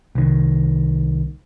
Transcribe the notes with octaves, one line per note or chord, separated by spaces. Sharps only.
C2 D#3